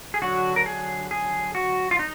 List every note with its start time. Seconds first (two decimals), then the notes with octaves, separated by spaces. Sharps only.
0.14 G#4
0.22 D3 F#3 D4 F#4
0.56 A#4
0.66 G#4
1.11 G#4
1.55 F#4
1.91 F4
1.99 D#4